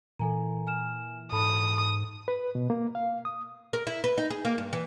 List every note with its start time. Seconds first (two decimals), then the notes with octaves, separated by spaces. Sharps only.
0.19 A#2 E3 A4 G#5 A#5
0.67 G#5 F6 E7
1.32 G#2 A4 A5 B5 D#6
2.28 B4
2.55 B2
2.70 A#3
2.95 F5
3.25 D#6
3.73 A#4
3.87 E4
4.04 B4
4.18 D#4
4.30 G#4
4.45 A#3
4.58 G2
4.73 E3